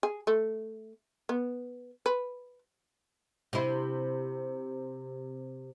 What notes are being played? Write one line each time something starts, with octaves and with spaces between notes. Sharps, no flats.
G#4
A3
B3
B4
C3 E4